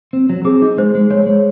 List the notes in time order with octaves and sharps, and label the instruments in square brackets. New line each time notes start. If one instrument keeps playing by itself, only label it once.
[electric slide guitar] C4
F#3
[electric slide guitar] C4 [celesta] G#4
[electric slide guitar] D#4
[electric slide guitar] G#3 [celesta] C5
[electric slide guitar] G#3
[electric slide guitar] G#3 [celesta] C#5
[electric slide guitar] G#3